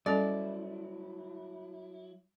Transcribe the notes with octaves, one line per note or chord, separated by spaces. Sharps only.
F#3 G3 C#4 E4 A4 D5